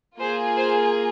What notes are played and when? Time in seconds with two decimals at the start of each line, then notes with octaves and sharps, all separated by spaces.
0.20 A#3 F4 G#4 C5
0.57 C5